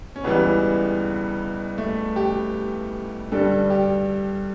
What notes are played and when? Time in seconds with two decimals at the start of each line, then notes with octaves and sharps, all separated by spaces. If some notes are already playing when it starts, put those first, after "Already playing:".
0.16 C#4
0.24 C#2 C#3 E3 G3 B3
1.78 A3
2.16 G4
3.32 G2 D3 G3 A4
3.70 G4